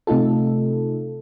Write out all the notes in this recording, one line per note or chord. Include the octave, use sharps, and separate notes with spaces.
C3 A3 D#4 F4 A4